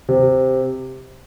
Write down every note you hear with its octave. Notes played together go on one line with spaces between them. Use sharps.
C3